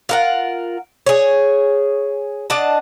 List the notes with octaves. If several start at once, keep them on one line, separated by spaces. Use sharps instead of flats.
F4 A#4 F#5
G#4 C#5
D4 D#5 F#5 A5